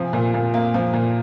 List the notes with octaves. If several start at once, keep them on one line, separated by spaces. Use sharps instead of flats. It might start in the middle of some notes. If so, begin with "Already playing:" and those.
Already playing: C3 F3 G#5
A#2
A#2
A#3
F3
A#2